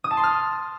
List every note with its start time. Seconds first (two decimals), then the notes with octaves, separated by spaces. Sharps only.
0.04 D#6
0.11 A5
0.17 C6
0.24 F6